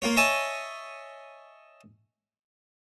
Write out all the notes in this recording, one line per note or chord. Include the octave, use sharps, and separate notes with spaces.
A#3 F4 C#5
C#5 D#5 E5 G#5 A5 C#6